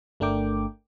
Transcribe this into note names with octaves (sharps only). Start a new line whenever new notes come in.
G1 A3 D4 A#4 G5 D6